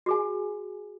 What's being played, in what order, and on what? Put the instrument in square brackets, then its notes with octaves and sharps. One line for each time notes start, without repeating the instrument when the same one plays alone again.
[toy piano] F#4 G#4 G#5